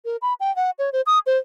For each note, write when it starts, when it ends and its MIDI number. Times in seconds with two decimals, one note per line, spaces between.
0.05 0.17 70
0.22 0.34 83
0.40 0.54 79
0.56 0.70 78
0.79 0.90 73
0.92 1.01 72
1.06 1.19 87
1.26 1.37 72